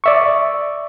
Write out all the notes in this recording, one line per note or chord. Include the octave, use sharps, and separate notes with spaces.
D5 E5 C#6